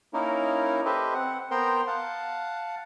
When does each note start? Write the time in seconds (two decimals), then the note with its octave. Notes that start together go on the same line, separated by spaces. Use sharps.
0.14 A#3 C#4 D#4 E4 A#4
0.85 G4 A4 B4 C5 D#5 E5
1.14 C4 F#5
1.51 B3 A#4 C5 G5 A#5 C6
1.87 F5 F#5 A5